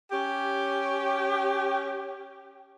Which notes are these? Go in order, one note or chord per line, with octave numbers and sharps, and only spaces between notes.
C#4 G4